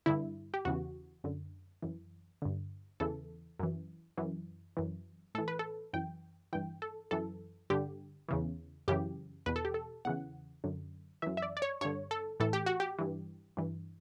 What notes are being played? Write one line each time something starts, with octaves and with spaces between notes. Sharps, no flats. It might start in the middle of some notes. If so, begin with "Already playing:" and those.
G2 D3 E4
G4
E2 C#3 E3 F#4
F#2 D3
F#2 E3
G2 D3
E2 C#3 E3 A4
F#2 E3
F#2 E3
F#2 E3
A2 E3 A4
B4
A4
F#2 E3 G5
G2 E3 G5
A4
F#2 E3 A4
G2 D3 G4
E2 C#3 E3
F#2 C#3 E3 G4
E2 B2 B4
A4
G4
A4
E2 C#3 E3 F#5
F#2 D3
F#2 E3 E5
E5
D5
D5
C#5
G2 D3 C#5
A4
A2 E3 A4
G4
F#4
G4
G2 E3
G2 E3